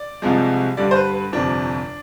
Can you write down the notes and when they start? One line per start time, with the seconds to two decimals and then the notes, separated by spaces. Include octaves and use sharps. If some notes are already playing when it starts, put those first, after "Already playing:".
Already playing: D5
0.22 C2 C3 F3 G#3
0.77 G2 D3 G3 D5
0.91 C5
0.96 B4
1.14 B4
1.32 G1 F2 C3 F3 D4